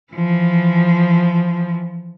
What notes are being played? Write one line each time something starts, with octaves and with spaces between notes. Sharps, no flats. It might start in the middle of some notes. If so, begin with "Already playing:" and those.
E3 F3